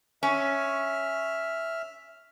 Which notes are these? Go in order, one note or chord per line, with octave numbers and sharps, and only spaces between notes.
C#4 E5 F6